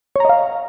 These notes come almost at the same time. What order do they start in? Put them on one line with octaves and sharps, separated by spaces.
C#5 A#5 D#5 F5